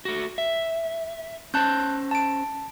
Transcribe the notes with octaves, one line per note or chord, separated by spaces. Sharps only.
A3 F#4
E5
C#4 C5 A5 F#6 G6
A5 D7